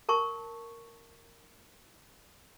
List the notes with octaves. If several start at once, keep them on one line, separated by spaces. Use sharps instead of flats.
A#4 A5 C#6